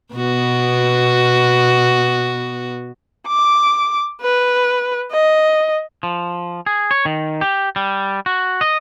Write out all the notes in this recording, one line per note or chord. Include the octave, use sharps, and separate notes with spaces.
B2 B3 F#4
D6
B4
D#5
F3
G#4
C#5
D#3
G4
G3
F#4
D#5